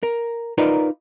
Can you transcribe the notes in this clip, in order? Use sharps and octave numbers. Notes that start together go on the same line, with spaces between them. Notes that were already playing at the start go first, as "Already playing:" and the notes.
A#4
D#4 F4 A#4 B4 D5